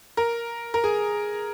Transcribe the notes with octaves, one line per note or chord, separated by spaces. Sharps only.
A#4
A#4
G#4